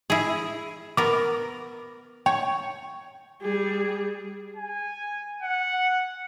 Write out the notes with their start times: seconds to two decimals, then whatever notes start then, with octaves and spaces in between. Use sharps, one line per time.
0.10 E4 G#4
0.97 B3 A#4 D6
2.26 C#5 G5
3.42 G3 G#4
4.56 G#5
5.43 F#5